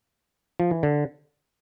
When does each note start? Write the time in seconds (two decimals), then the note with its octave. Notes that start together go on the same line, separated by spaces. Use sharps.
0.60 F3
0.71 E3
0.83 D3